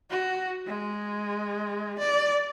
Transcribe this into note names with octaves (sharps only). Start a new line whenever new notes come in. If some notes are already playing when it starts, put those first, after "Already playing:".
F#4
G#3
D5